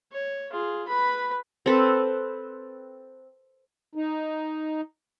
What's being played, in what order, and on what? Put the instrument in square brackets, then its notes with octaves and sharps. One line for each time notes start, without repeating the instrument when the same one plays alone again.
[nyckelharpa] C#5
F4 G#4
B4 B5
[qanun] C4 A4 B4
[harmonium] D#4